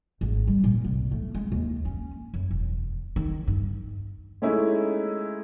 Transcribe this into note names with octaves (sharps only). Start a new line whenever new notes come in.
G#1
G3
A#2
C2
A3
G#3
D#2
C#4
F#2
E1
D#3
G2
G#3 A3 C#4 D#4 E4